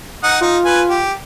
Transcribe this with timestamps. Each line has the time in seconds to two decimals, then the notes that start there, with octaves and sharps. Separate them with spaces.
0.23 D#4 F#5 D#6
0.41 D#4 F4
0.65 B4 G#5
0.90 G4